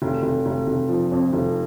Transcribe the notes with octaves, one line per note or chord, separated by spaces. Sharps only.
F1
F1
F1
F1
F3
F2
F1